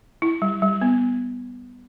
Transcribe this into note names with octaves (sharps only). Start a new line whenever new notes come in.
E4
G3
G3
B3